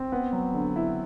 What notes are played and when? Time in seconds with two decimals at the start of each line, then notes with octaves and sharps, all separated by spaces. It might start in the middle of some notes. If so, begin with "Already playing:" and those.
Already playing: C4
0.12 B3
0.33 F#3
0.54 D3
0.76 E4